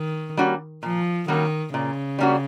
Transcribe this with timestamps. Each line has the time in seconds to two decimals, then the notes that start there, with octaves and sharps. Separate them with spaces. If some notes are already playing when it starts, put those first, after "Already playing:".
Already playing: D#3
0.37 G3 A#3 C#4 F#4
0.83 A#2 F3
1.28 D#3 G3 A#3 C#4 F#4
1.74 A#2 C#3
2.19 G3 A#3 C#4 F#4